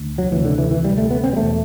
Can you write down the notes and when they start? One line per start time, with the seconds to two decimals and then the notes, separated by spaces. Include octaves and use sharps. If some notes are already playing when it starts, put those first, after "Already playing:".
Already playing: D2
0.18 F#3
0.31 D2 C3 E3
0.45 D3
0.58 E3
0.71 E3
0.84 G3
0.98 A3
1.11 B3
1.24 C4
1.33 G3
1.37 E2 B2 A3